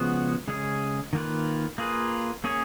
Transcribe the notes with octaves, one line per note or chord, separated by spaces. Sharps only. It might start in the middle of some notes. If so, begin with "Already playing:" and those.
Already playing: C#3 F3 G#3 B3 F#4
C#3 G#3 C#4 G#4
D#3 A#3 F4 B4
A#3 F4 G#4 B4
A#3 C#4 G#4 C#5